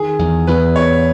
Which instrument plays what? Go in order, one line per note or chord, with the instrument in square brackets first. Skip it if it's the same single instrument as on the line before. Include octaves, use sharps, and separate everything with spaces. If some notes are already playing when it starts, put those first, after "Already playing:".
Already playing: [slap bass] D#3 [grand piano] G#4
[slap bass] E2
[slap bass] E2 [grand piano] B4
[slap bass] E2 [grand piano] C#5